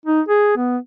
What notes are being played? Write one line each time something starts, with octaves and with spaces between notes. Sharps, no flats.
D#4
G#4
B3